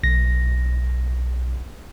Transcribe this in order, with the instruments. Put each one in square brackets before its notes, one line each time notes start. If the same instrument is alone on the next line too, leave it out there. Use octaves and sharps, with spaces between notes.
[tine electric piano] B1 A#6